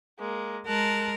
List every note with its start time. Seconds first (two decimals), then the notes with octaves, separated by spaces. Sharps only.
0.19 G#3 A#3
0.67 G#3 A#4 A5 F#6